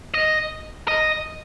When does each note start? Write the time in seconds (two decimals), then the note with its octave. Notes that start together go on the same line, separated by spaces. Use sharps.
0.14 D#5
0.88 D#5